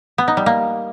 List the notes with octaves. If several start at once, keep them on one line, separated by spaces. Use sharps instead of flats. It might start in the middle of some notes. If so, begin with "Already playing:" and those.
B3
D#4
G3
A#3